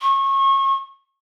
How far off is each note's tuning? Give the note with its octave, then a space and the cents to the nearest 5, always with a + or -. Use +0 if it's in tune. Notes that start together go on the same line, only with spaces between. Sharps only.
C#6 -30